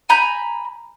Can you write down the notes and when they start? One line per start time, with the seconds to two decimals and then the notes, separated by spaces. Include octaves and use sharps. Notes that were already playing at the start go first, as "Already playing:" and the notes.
0.09 G#5 A#5 B5 G6